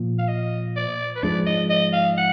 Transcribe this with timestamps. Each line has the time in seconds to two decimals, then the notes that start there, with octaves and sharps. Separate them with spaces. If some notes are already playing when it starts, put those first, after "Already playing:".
Already playing: A#2 F3
0.18 F5
0.28 D#5
0.76 D5
1.16 B4
1.23 G#2 F3 G#3 D4 D5
1.46 D#5
1.70 D#5
1.93 F5
2.17 F#5